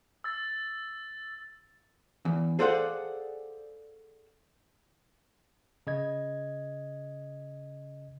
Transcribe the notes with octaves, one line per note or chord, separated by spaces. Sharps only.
E6 A6
E2
G#4 A4 C5 D5 F5 F#5
C#3 D#5 G#6